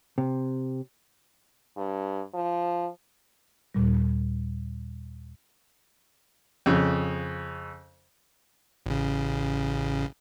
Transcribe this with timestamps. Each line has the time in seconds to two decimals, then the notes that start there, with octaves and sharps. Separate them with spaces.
0.18 C3
1.77 G2
2.34 F3
3.74 D#2 A#2 G3
6.66 F2 C#3
8.86 A1 C#3